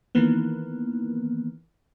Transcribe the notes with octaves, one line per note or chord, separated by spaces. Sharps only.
D#3 E3 A#3 B3